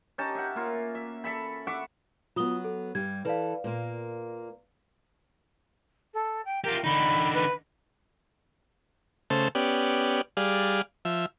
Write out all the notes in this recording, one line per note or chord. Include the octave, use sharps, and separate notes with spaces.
C#4 D#4 G4 A5
E5 F#5
A#3 F4
E5
A4 E5 B5
E5 F#5 C#6 D6
F#3 B3 F4 D#6 G7
A4
G2 G3 G#6
E3 A4 B4 D5 F5
A#2 A#3
A4
G5
F4 G4 A#4
D3 D#4 B5
B4
C#3 A3 C5 A5
B3 C#4 G4 D5
G3 G#4 D5 F5
F3 E5